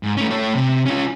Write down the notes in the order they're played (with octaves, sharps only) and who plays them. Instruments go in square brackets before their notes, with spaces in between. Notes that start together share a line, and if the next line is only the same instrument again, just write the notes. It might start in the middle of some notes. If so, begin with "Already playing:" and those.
[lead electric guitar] G#2
A3 C#4
A3 C#5
C3
C#4 F4